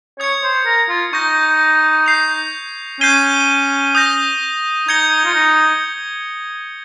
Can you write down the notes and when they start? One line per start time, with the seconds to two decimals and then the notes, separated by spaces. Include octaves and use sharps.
0.19 C#5 D#6 G#6 C#7
0.44 C5
0.66 A#4
0.89 F4
1.13 D#4 C#6 G6 A#6
2.06 G6 C7 F7
3.01 C#4 G6 C7 D#7 G7
3.95 D#6 G6 A#6
4.88 D#4 G#6 C#7 G7
5.25 F4
5.35 D#4